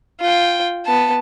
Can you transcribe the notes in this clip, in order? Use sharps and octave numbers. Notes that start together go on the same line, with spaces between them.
F4 G5
B3 A5